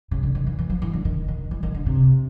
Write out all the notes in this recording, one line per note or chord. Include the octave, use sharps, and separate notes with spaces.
C#3
D3
D#3
E3
E3
F3
E3
D3
D#3
D#3
E3
D#3
D3
C3